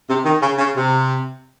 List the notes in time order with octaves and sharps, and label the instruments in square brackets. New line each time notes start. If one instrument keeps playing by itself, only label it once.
[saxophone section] C3
D#3
C#3
C#3
C3